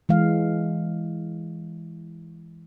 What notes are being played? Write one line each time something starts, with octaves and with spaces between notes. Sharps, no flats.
E3 G#3 F5